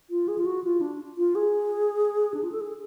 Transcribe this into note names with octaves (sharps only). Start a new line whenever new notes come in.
F4
G#4
F4
F#4
F4
D4
F4
G#4
D4
F4
A4
G#4